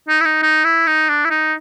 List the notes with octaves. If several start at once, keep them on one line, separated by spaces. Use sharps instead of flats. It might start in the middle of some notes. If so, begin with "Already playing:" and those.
D#4
E4
D#4
D#4
E4
D#4
D4
E4
D#4